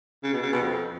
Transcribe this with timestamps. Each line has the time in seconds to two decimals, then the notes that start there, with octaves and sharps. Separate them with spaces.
0.23 C#3
0.33 B2
0.43 C#3
0.52 B2
0.62 F2